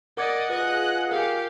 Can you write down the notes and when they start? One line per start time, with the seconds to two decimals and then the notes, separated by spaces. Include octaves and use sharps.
0.17 A#4 D5 D#5 F#5 D6 G#6
0.50 F4 G#4 B4 D#5 F#6
1.11 G4 A#4 F5 G#5